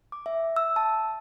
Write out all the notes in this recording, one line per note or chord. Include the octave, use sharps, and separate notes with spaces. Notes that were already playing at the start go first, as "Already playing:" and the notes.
D6
E5
E6
A5